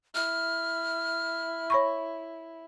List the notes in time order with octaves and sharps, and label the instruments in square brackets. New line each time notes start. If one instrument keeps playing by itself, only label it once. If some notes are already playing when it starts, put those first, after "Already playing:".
[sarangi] E4 [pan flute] F6
[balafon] C#5 B5 C#6